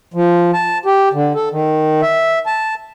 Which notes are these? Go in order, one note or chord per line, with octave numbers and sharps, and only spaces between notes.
F3
A5
G4
D3
A4
D#3
E5
A5